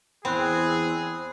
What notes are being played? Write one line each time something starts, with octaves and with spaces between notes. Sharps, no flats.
E2 C4 G#4 B5 F#6